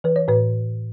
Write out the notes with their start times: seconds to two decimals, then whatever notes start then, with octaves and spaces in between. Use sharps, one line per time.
0.04 E3 B4
0.16 C#5
0.28 A2 B4